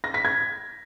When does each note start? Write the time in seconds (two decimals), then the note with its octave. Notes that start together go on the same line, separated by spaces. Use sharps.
0.04 A#6
0.14 B6
0.25 G#6